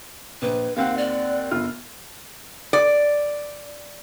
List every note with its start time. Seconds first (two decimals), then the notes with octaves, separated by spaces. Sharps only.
0.42 A#1 B4
0.76 D#2 C4 F5 F#5
0.97 D5
1.51 G1 F4 F6
2.73 D5